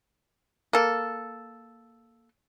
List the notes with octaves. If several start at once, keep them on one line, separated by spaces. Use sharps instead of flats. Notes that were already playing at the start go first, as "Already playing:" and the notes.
A#3 A4